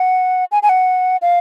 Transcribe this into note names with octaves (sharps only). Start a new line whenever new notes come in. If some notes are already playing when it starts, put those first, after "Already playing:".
Already playing: F#5
G#5
G#5
F#5
F5